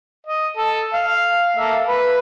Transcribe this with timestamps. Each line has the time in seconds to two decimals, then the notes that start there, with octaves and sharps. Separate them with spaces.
0.27 D#5
0.57 A4
0.93 F5
1.57 A#3 A4 E5
1.87 B4